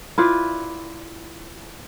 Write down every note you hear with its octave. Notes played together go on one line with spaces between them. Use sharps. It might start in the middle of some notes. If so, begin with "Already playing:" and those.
E4 F4 B4 D5